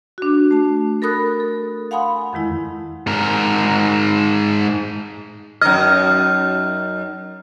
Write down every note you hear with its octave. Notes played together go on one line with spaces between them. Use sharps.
D4 F#4
A3 A5
A4 A#4 B5 D#6 F#6 A6
A4
F5 F#5 G#5 B5 C6 D#6
F2 D#3 G#3 E4
G#2 A#4
F#2 D#4 D#5 F6